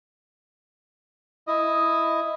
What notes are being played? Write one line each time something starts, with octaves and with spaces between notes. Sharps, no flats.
E4 D#5